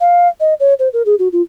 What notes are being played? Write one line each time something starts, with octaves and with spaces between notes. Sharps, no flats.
F5
D#5
C#5
C5
A#4
G#4
F#4
F4